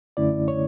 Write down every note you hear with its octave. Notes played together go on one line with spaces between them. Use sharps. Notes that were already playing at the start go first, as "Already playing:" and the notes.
F#2 D3 A3 C#4 E4 D5
C#5